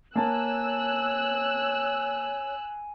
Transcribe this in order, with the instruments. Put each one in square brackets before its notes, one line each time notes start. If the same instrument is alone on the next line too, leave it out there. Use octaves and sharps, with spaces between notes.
[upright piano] A#3 A5 [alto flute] C#5 [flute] G#5 [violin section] E6 F#6